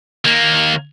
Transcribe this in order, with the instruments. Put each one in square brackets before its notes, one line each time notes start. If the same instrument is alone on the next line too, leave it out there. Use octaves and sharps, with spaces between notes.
[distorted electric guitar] D#2 A#3